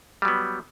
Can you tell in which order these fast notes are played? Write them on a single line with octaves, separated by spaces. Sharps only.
G3 F#3 B3